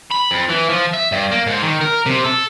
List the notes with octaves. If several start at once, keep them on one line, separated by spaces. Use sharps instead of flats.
B5
F2
E3
F3
E5
G2
A#3
G#2
D#3
A#4
C3
A4